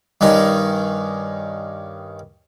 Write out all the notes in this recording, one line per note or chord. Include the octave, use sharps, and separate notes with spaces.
G2 D#3 C#4 D#4